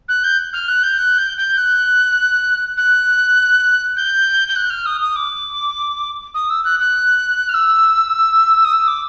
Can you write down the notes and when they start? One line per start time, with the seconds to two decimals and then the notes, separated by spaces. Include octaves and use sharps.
0.08 F#6
0.23 G6
0.53 F6
0.68 F#6
0.83 G6
0.98 F#6
1.18 G6
1.37 G6
1.57 F#6
2.77 F#6
3.96 G6
4.48 G6
4.56 F#6
4.70 F6
4.86 D#6
5.01 D#6
5.16 D6
6.34 D#6
6.49 E6
6.64 F#6
6.79 F#6
7.49 F6
7.54 E6
8.64 D#6
8.73 E6
8.87 D6